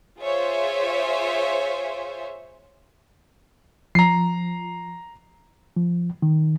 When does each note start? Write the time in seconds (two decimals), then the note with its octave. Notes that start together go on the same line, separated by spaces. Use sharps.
0.20 F4 G#4 C5 C#5 E5
3.95 F3 A#5 C7
5.76 F3
6.22 D#3